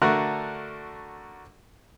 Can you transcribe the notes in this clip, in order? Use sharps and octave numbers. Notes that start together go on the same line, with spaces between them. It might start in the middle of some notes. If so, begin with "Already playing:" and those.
D3 A3 F#4 A#4 F6 F#6